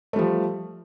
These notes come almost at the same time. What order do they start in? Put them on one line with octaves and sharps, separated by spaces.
A3 G3 F3